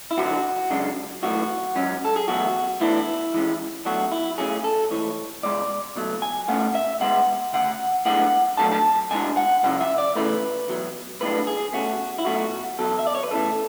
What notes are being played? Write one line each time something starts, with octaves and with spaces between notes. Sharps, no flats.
E4
F#2 D3 F#3 F#4
F#2 C#3 G#3 D4
B1 A2 E3 F#4
G#2 F#3 C#4
A4
G#4
E2 B2 F#3 A3 F#4
A2 E3 B3 D4 E4
G#2 E3 G#3 C#4
B2 F#3 A3 D4 F#4
E4
B1 A2 F#3 C#4 G#4
A4
G#2 E3 A3 C#5
C#2 B2 G#3 D5
C#2 B2 F#3 A3
G#5
B2 A3 C#4 F#5
E5
B2 G#3 B3 F#5
D2 C#3 F#5
B1 A2 G#3 B3 D4 F#5
B2 F#3 A3 D4 A5
A5
B2 G#3 D4 G#5
F#5
C#2 C#3 F#3 C#4 F#5
E5
D5
E2 C#3 E3 A3 B4
E2 B2 F#3
B1 A2 G#3 B3 D4 B4
G#4
B2 A3 C#4 F#4
E4
B1 B2 A3 C#4 F#4
E2 B2 F#3 A4
E5
D5
C#5
B4
E2 C#3 E3 A3 A4